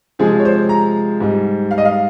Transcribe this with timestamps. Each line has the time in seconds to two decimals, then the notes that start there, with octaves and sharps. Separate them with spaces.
0.19 C3 F3 G#3 G#4
0.39 C#5
0.45 C5
0.69 A#5
1.20 G#2 G3
1.71 F5
1.78 D#5
1.85 F5